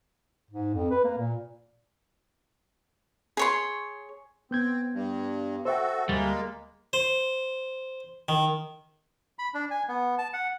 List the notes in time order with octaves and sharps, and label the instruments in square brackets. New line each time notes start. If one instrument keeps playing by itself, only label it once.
[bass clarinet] G#2
F2
B4
A#3
A#2
[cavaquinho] G#4 C#5 C6
[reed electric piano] B3 G6 G#6 [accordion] C4
[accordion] G2
[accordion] F#4 A4 [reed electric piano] C5 E5 G5
[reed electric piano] D2 A6 [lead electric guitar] G3 [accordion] G#3 A#3
[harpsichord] C5
D#3
[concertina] B5
D4
G#5
B3
A5
F#5